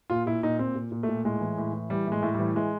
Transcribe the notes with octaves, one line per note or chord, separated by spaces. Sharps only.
A#2 F4
A#2 E4
A#2 D#4
A#2 C4
A#2
A#2
A3
A#2
A2 G#3
E3
A2
E3
E3 G3
A2 G#3
A2
E3 G3
E3 G#3